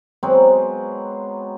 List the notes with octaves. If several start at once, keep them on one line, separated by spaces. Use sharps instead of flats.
F#3 G#3 B3 C4